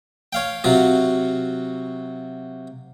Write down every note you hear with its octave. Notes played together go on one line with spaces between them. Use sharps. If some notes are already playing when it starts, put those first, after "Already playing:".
C#5 F5 G5
C3 F#3 F4 F#4